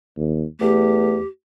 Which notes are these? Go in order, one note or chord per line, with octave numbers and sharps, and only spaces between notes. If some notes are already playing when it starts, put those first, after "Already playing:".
D#2
E2 A3 G4